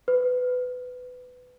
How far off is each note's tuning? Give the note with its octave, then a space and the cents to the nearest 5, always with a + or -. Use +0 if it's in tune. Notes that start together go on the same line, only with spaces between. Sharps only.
B4 +20